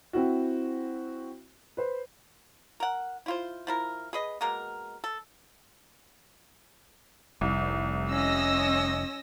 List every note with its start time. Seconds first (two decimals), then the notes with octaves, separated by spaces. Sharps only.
0.13 C4 E4 F#4
1.77 B4 C5
2.80 A#4 F#5
3.26 E4 F4 C5
3.67 F3 E4 A#4
4.13 G#4 B4 D#5
4.41 B2 G#3 A#3 A#4
5.04 A4
7.41 F1 C2
8.10 C#4 D#5 E6 A#6